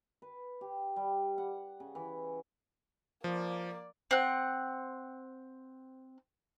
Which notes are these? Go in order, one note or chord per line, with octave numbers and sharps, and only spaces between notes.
B4
G4
G3
F#5
C#3
E3
F3 A#3 D5
C4 F#5